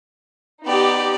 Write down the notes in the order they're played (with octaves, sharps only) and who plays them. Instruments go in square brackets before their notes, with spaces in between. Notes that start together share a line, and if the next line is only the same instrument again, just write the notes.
[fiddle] B3 D5 [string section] D#4 G4